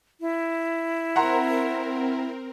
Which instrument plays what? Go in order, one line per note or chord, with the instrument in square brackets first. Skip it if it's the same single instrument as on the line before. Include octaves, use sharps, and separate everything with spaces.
[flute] E4
[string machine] C4 A#4 [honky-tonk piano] F#5 A#5 C6